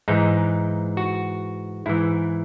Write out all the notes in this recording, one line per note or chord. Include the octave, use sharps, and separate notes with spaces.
G#2 E3 D#4
F#4
G#2 E3 E4